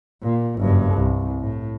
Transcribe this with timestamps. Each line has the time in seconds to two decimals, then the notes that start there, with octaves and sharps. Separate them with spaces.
0.23 A#2
0.58 F#1 G2
0.94 C2
1.40 A2